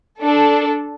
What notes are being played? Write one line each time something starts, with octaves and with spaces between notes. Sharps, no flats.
D4 A4